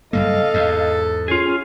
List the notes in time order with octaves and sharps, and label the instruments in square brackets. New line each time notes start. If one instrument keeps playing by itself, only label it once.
[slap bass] F#1 G2 A#3 [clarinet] A4 [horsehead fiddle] D#5 F5
[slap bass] E2 G#2
[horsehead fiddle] C#4 [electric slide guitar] F4 G#4